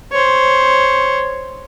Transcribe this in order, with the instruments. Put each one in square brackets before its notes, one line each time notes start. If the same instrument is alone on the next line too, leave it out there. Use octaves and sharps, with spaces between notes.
[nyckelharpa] C5 C#5